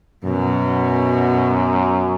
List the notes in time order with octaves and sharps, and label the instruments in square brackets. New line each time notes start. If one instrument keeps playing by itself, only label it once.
[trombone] F#2 [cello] B2 F#3